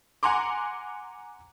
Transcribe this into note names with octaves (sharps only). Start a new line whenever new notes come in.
F#5 G#5 A#5 C6 D6